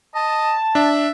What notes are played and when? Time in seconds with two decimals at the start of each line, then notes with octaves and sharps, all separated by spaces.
0.15 D#5 A5
0.75 D4 E5